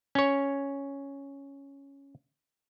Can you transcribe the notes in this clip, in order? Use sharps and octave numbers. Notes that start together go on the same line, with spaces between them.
C#4 C#5